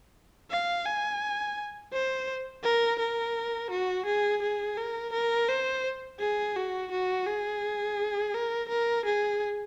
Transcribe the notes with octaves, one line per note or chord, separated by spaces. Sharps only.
F5
G#5
C5
A#4
A#4
F#4
G#4
G#4
A#4
A#4
C5
G#4
F#4
F#4
G#4
A#4
A#4
G#4